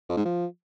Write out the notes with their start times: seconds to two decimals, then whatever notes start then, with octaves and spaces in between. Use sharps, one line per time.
0.09 F2
0.17 G#2
0.25 F3